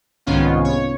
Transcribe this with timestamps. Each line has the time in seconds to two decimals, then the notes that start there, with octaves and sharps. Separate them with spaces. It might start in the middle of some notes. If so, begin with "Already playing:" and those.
0.26 C2 G#2 D#3 B3 C#4 F4
0.65 C#5